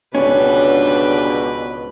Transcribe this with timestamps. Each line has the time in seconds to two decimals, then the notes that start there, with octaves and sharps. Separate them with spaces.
0.15 C#2 G#2 B2 D3 G3 C#4 D4 B4